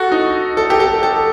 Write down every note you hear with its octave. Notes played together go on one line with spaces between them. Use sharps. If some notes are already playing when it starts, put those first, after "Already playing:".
Already playing: F#4 A4
D#4
A4
G4
A4
A4